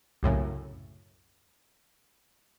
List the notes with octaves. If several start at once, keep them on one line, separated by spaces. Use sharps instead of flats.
C2 F#2 A2 C#3